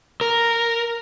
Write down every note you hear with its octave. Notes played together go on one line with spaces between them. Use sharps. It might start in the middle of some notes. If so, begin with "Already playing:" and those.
A#4